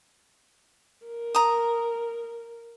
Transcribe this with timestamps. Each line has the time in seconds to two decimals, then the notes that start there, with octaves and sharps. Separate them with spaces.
1.06 A#4
1.35 A#5 D#6